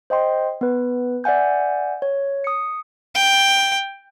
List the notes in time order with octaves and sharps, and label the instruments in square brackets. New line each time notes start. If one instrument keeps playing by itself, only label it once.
[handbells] C5 D#5 G5 C6
B3 B4
D5 E5 F#5 G#5 G6
C#5
D#6 C#7
[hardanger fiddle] G5